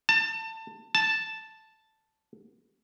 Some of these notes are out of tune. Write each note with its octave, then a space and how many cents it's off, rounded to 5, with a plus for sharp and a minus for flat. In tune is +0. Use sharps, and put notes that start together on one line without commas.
A5 +25
A5 +0